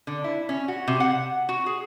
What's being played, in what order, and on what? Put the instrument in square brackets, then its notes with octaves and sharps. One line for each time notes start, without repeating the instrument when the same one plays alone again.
[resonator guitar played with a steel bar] D3
E4
C#4
F#4
C3
F#5
F#4
G#4